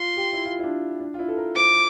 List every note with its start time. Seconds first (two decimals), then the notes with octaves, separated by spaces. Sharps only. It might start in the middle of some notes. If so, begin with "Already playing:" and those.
Already playing: F4 C6
0.17 G4
0.33 E4
0.45 F4
0.59 E4
0.63 D4
1.00 D4
1.14 F4
1.19 E4
1.28 A4
1.37 A#4
1.56 C5 D6